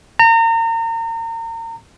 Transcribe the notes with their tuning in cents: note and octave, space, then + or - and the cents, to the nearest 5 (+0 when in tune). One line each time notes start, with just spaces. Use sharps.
A#5 -35